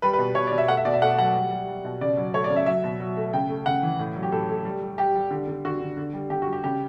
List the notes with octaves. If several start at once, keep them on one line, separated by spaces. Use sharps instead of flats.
G3 B4
B4
B2
B2 C#5
D5
B2
E5
A3 F#5
E5
B2 D5
E5
A3 F#5
F#3 F#5
G3
G3
G3
B2
C#3 D5
F#3
A3 C#5
D5
C#3
E5
F#3 E5
B2
F#3
A3
C#3 G5
A3
C#3 F#5
E3
A2
F#3
G4
A2 A4
A3
G3
G3
G3 G4
G3
D3
D3
D3 F#4
D3
D3
G3
D3 G4
F#4
G3
G4
C#3 G4